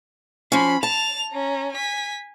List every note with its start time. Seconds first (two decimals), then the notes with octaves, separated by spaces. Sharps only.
0.52 F3 C#4 B5 C6
0.83 A5 A6 F7
1.32 C#4 A#5
1.72 G#5 B6